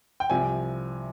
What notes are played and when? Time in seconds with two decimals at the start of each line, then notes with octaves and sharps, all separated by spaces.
0.20 G5
0.30 C2 C3 F3 G#5